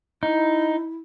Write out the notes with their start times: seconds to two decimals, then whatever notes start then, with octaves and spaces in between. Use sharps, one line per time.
0.23 D#4 E4